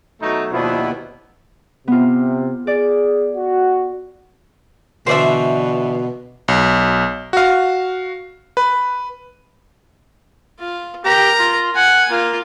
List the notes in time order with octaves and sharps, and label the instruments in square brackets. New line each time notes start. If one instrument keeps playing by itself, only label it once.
[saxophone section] B2 F#3 A3 [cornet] D#4
[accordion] D#2 B2 B3 [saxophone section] F3 D4 F4 [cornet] E4
[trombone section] C3 [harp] B3 F4
[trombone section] G#4 [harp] D5
[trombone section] F#4
[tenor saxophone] B2 [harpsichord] D3 E3 D4 [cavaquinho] C5 D5 E5
[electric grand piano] B1
F#4 F5
B4
[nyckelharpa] F4
[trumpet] G4 [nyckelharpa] A#4 A#5
[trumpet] F4
[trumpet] F#5 [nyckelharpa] G#5
[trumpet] A#3 [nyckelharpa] F4